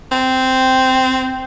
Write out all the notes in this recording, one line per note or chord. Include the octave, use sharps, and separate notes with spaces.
C4